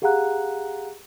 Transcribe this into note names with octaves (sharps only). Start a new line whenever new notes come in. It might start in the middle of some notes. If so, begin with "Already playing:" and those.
G4 G#4 F5 F#5 A#5 F#6